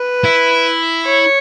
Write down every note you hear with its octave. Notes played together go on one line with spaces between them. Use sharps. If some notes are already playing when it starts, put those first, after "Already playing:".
Already playing: B4
E4
C#5